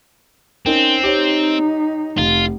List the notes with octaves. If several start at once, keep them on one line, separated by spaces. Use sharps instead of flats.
C4 C#4 D#4 A#4
D#4 G4 C#5
F1 F4